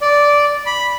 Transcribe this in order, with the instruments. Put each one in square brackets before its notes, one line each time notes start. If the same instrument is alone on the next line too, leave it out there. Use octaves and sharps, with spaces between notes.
[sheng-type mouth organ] D5
B5